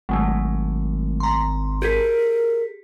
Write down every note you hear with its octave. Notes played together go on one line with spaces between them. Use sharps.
G#1 F#3 G#3 A3
A#5 C6
G4 G#4 A#4 B6